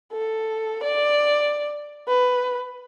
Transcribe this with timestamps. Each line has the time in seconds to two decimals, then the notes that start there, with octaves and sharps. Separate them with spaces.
0.13 A4
0.83 D5
2.08 B4